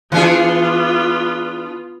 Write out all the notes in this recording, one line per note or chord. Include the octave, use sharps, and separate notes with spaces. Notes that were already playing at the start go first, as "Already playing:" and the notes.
E3 B3 D4 F4 G#4